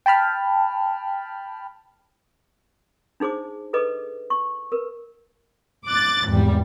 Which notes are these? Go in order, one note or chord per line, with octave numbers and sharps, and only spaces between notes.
G5 A5 B5 F6
D4 D#4 G#4 C5 D6
G#4 A4 B4 D#5 D6
C#6
A#4 B4
D6 F#6 A6
G#1 E2 G3